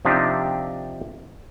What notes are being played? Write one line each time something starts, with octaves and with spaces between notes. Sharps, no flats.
C3 F3 C4 D4 D#4 G4